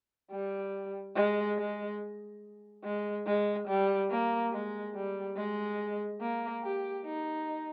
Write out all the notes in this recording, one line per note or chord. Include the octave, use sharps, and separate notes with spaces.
G3
G#3
G#3
G#3
G#3
G3
A#3
G#3
G3
G#3
A#3
G4
D#4